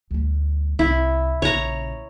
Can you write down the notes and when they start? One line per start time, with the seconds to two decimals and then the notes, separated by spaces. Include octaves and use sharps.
0.11 D2 G3
0.79 C2 E4
1.42 A#1 C#3 C#5 A#5